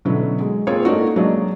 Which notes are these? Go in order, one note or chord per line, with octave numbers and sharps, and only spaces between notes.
B2 D3 F#3 B3 C#4 E4
G#3
A#3 C4 F4 G#4 C#5
A3 A#3 D4 D#4 F#4
F#3 G#3 A#3 D4 D#5